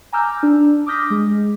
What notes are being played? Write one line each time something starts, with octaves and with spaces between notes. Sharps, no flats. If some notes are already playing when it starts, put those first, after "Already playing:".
G#5 A#5 D6 E6 F6 G6
D4
D6 D#6 F6 G6 A#6 B6
G#3 G#4